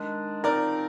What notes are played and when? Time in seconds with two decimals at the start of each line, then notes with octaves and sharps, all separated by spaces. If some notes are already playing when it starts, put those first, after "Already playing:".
Already playing: D#3 G#3 D4
0.44 F3 C4 D#4 A#4 D5